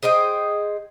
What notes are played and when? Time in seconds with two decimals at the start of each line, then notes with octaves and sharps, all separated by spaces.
0.03 G#4 C5 D#5 G5